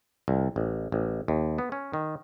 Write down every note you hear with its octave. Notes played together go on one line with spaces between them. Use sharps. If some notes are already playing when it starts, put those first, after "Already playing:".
C2
A1
A1
D#2
B3
C#4
D#3